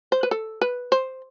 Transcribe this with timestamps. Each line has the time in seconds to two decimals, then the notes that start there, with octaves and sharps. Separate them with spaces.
0.12 C5
0.23 B4
0.31 A4
0.61 B4
0.92 C5